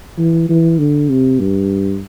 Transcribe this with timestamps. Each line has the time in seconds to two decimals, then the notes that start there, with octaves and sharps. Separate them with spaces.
0.18 E3
0.49 E3
0.79 D3
1.10 C3
1.40 G2